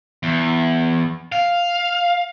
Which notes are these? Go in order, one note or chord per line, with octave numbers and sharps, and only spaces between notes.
E2
F5